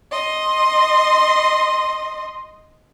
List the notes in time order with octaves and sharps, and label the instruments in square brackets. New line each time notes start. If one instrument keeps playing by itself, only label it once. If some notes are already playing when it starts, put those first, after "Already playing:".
[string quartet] D#5 C6